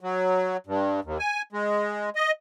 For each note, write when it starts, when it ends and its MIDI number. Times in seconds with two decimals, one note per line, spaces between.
0.01 0.57 54
0.67 1.00 43
1.04 1.18 39
1.19 1.42 80
1.53 2.10 56
2.16 2.31 75